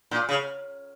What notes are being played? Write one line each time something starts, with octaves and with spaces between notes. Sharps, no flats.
A#2
C#3